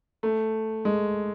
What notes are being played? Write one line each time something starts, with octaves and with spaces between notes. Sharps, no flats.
A3
G#3